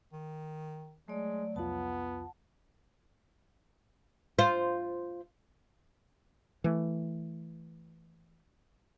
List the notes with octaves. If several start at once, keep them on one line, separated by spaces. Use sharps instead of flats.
D#3
F#3 G#3 A3 D5
C2 F2 B3 F4 F#5 A5
F4 C5
E3 A3